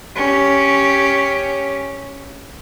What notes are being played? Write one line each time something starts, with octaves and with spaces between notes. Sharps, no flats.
C#4 G4